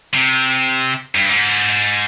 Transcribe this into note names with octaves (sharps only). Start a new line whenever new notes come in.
C3
G2
G#2